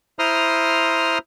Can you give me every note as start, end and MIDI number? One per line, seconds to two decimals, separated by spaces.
0.19 1.18 64
0.19 1.18 72
0.19 1.18 82
0.19 1.18 84
0.19 1.18 87
0.19 1.18 89